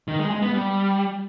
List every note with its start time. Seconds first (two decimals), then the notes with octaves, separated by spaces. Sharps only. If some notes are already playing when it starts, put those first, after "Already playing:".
0.08 D#3
0.19 G#3
0.31 G#3
0.42 B3
0.53 G3